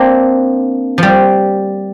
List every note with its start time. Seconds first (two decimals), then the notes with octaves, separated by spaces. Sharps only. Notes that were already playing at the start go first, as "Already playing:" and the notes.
Already playing: A#3 C4 D4
0.98 F3 G3